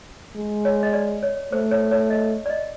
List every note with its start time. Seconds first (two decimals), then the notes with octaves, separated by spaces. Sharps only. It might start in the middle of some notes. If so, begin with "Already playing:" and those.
0.36 G#3
0.65 C#5
0.83 D#5
0.93 D5
1.23 C#5
1.52 A3 C5
1.71 C#5
1.91 C#5
2.10 D#5
2.46 D5
2.50 D#5